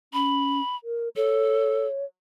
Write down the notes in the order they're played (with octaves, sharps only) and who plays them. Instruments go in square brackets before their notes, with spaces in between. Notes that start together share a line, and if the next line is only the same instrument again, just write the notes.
[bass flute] C#4 [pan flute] B5
[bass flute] A#4
[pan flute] A4 [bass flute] C#5